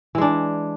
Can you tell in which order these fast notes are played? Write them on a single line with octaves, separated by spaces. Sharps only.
E3 G#3 D4